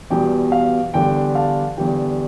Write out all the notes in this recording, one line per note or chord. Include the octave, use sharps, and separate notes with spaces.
E2 B2 G3 G5
F5
E2 D3 G3 G5
F5 A5
E2 D3 G3 G5